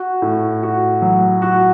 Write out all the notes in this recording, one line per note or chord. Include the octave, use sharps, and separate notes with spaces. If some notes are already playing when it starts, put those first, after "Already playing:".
Already playing: F#4
A2
F#4
F#3
F#4